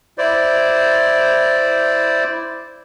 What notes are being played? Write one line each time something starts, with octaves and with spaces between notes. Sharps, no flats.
E4 C5 D5